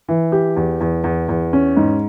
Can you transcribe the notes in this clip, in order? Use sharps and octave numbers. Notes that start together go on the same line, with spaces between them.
E3
G4
E2
E2
E2
E2
C#4
G#2